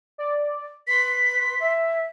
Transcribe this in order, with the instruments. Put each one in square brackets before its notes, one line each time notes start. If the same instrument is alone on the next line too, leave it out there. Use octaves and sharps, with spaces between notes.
[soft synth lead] D5
[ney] B4 [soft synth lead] C6 [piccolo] B6
[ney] E5